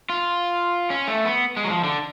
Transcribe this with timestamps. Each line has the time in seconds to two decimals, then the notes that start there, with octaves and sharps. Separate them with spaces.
0.09 F4
0.90 C#4
1.08 A3
1.25 B3
1.57 G#3
1.65 F#3
1.70 F3
1.84 D3